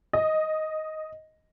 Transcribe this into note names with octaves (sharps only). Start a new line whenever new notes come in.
D#5